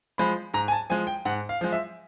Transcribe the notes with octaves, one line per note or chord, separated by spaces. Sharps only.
F3 G#3 B5
G#2 A#5
G#5
A5
F3 G#3 G#5
G5
G#2 F#5
F5
F3 G#3
E5